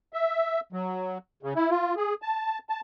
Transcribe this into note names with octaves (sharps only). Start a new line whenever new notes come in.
E5
F#3
C#3
E4
F4
G#4
A5
A5